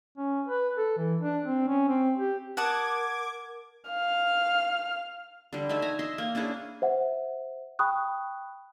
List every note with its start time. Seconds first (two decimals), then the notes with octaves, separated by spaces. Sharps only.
0.17 C#4
0.48 B4
0.78 A4
0.98 E3
1.21 D4
1.45 C4
1.68 C#4
1.89 C4
2.18 G4
2.57 A#4 F#5 A5 D6 D#6 G#6
3.90 F5 F6
5.53 D3 G3
5.69 A3 D#4 E5 G#5
5.82 G#5 A#5
5.99 D#5 E5 C6
6.18 A#3
6.35 C#4 D4 E4 G#4
6.82 C5 E5 F#5
7.79 G5 B5 C#6 D#6 F#6